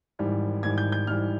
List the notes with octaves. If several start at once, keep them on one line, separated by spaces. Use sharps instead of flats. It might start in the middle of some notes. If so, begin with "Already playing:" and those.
G#1 G#2 E3 G3
G#1 G#2 E3 G3 G#6
G6
G6
G#1 G#2 E3 G3 F6